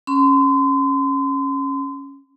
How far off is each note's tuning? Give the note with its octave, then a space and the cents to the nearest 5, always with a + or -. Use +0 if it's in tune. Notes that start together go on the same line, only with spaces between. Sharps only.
C#4 -10 C6 -35